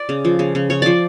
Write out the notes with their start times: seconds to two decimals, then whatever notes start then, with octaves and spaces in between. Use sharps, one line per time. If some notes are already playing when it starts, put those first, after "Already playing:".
Already playing: D5
0.09 C#3
0.25 F3
0.39 C#3
0.55 C#3
0.70 C#3 C#5
0.82 F3 D5